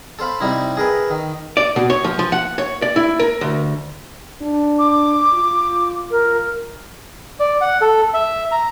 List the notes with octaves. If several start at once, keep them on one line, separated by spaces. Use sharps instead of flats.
A4 C5 F5 B5
C3 G3 D#4 E4
G#4 A#4 B4 E5
D#3
D5
B2
C#5
F3
F3
F#5
C#5
D5
E4
A#4
D2
D4
D6
F4
A#4
D5
F#5
A4
E5
A#5